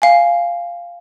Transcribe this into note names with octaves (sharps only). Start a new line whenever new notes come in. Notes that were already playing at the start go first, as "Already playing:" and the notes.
F5 G#5